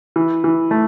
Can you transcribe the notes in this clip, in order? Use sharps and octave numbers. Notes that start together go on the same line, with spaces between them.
E3
E3
A3